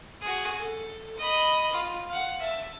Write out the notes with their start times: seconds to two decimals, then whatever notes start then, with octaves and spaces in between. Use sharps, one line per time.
0.21 F#4 G#4
0.57 A4
1.17 D#5 B5
1.73 F4
2.09 F5 F#5
2.39 E5 A5